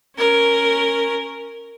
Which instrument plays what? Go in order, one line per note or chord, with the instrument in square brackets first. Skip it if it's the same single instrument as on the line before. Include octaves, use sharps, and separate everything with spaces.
[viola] C#4 A#4